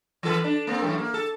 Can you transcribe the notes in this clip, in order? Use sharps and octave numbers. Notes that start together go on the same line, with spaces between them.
E3 A4 B4
D4
A#3 C4
F#2 A2 E3
A#3
A4